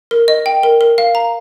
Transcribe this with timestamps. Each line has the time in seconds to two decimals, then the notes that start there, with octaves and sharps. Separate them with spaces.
0.11 A#4
0.28 D#5
0.46 G5
0.63 A#4
0.81 A#4
0.98 F5
1.15 A#5